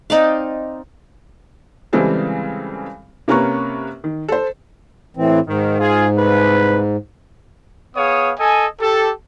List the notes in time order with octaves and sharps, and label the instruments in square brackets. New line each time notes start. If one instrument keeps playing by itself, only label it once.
[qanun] C4 D#4 D5 F5
[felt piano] C#3 E3 G3 G#3 C4 A4
C3 A#3 C#4 A#4 B4 C#6
D#3
A4 C5
[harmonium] A2 E3 C4
[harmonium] G#2 [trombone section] D#3
[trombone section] F4 G#4
C2 B4
[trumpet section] B3 G#4 C#5 F5 D#6
A4 D#5 G#5
G4 A4